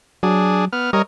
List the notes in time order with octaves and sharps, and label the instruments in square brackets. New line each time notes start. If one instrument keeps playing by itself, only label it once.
[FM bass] F#3 [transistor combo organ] D4 G#4
[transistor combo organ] B3 F6
[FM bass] G3 [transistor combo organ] A#4 C#5 D#5